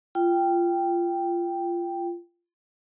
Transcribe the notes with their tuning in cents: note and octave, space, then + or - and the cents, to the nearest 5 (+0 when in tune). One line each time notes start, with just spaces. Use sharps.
F4 -15 G5 +0